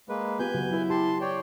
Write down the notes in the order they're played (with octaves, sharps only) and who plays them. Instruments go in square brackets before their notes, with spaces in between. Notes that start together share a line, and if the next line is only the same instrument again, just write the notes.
[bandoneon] G#3 A#3 B4
[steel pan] B3 F4 G4 [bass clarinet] B4 [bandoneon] G#5 G6
[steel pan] C#3 F#3 F#4
[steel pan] F#3 B4 [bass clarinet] E4
[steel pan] G4 [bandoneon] A5 C6
[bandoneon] C#5 D5 G5